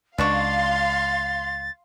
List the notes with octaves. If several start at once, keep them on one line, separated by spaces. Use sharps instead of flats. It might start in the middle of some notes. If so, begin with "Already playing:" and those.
C#2 B2 D4 F5 C6 C#6 A6